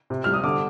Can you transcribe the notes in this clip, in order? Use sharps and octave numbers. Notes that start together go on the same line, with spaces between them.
C3
G3 F6
D#6
D3 D6